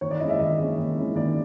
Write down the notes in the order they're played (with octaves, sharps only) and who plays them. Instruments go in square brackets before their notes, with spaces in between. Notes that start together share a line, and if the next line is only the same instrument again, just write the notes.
[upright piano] D#3 C#5
D5
G#3 C#4 E4 D#5
E5
D#3 D#5
G#3 C#4 E4
D#3
G#3 C#4 E4
D#3 D5